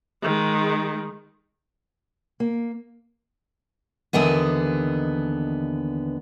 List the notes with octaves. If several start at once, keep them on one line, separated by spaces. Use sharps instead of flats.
D#3 G#3
A#3
D#2 D3 E3 B3 D#5